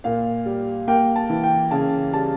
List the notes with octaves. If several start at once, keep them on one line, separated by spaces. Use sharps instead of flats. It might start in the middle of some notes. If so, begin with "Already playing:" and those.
A#2 F5
G3
A#3 G5
A5
E3
G5
C#3 A5
G3 A5